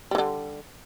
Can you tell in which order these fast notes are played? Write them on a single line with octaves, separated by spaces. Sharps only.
G3 E3 D3